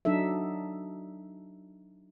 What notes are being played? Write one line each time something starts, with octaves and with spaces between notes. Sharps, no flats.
F#3 D4 D#4 A4 E5